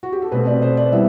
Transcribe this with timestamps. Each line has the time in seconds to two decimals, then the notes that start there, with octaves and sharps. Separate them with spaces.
0.03 F#4
0.12 G4
0.22 A4
0.32 B2 A3 C4 B4
0.47 D5
0.62 C5
0.77 D5
0.92 E3 G3 B3 E5